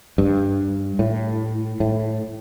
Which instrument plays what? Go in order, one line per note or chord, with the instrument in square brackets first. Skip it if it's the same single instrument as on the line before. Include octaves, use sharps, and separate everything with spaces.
[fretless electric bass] G2
A2
A2